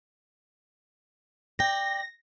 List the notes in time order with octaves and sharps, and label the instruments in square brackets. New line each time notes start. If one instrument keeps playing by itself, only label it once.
[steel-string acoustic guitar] D5 G5 [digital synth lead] A#6